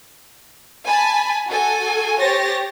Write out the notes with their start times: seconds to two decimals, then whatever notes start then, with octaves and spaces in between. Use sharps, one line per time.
0.85 G#5 A5 B5
1.48 F#4 A4 G#5
2.19 G4 C5 C#5 A6 A#6